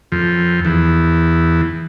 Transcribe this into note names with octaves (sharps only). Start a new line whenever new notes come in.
F2
E2